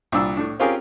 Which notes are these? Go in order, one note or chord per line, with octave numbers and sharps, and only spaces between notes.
C2 A#2 D4 E6
A2 D4
C4 C#4 F4 G4 G#4 A#4